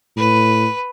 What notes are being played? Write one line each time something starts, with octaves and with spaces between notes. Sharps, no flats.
A2 B4